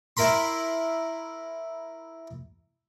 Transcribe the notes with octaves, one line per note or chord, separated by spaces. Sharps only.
E4 A#4 B5 C6